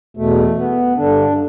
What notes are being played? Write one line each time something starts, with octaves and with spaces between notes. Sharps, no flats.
E2 B2 A3
B3
G2 D3 D4